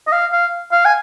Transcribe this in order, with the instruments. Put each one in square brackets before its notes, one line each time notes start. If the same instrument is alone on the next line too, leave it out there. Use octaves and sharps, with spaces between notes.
[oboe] D#5
F5
F5
F5
G#5